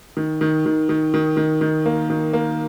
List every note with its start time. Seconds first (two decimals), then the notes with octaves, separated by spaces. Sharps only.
0.17 D#3
0.41 D#3
0.66 D#3
0.89 D#3
1.14 D#3
1.37 D#3
1.61 D#3
1.86 A#3
2.10 D#3
2.33 A#3